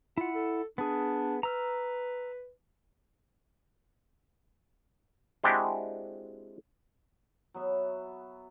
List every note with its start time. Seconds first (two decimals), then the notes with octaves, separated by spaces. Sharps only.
0.18 E4 F4 F#5
0.35 A4
0.78 B3 D4 G#4
1.43 B4 A#5 E6 F6
5.44 G#3 C4 D4 E4 F#4 G4
7.54 F#3 B3 E5